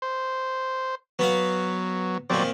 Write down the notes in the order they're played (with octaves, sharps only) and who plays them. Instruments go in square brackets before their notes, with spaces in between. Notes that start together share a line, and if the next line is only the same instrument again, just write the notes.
[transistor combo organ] C5
[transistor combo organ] F#3 [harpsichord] B3 F#4 F5
[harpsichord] F2 A#2 D#3 [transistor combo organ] F#3 C4 D5